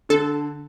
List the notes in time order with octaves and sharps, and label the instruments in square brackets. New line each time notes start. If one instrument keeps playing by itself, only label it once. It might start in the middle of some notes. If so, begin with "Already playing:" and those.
[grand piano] D3 [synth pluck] A4